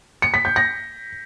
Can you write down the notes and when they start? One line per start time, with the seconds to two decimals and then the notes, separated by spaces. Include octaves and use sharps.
0.22 C#7
0.34 B6
0.45 G6
0.56 A#6